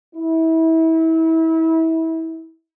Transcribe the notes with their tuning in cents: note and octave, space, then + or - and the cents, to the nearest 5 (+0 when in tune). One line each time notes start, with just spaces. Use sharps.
E4 -30